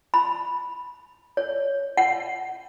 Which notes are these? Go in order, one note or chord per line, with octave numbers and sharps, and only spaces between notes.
B5
C#5
F#5